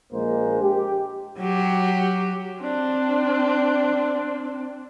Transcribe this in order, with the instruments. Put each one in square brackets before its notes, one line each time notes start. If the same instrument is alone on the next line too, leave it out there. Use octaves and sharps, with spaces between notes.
[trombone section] A#1 G#3 A#3 C5
G4
[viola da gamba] F#3 G4
[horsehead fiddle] C4 D4